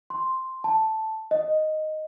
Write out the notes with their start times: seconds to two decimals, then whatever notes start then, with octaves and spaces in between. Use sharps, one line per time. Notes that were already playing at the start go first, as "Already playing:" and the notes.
0.10 C6
0.64 A5
1.31 D#5